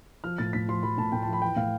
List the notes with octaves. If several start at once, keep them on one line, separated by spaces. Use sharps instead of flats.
F3 F6
A2 A6
A2 B6
F3 C6
F3 B5
A2 A5
A2 G5
A5
F3
B5
E3 G5
A2 F5